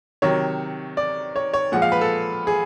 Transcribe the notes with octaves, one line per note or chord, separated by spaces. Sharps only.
C3 D#3 F#3 C#5
D5
C#5
C#5
A#2 F3 G#3 F#5
F5
B4
A4
G#4